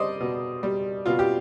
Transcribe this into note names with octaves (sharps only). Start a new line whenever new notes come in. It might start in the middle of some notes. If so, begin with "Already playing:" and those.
Already playing: G3 C5 D5 D#5
B2
G3
B2 F4
G4